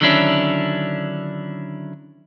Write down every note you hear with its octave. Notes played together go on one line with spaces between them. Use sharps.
D3 D#3 F#3 C#4 D4 E4